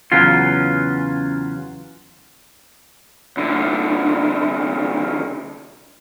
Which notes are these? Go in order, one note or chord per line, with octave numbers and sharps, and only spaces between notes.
E2 C#3 F#3 C#4 F4
C2 D3